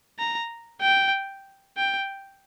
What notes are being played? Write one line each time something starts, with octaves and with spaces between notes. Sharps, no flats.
A#5
G5
G5